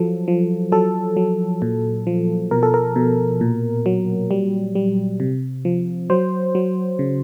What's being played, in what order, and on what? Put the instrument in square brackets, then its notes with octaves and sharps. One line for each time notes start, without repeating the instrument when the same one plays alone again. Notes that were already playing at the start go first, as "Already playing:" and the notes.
Already playing: [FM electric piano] F3 F#3 A4
F3
F#3 A4
F#3
A#2
F3
B2 A#4
A4
A#4
B2
A#2
F#3
G3
G3
C3
F3
F#3 C5
F#3
C#3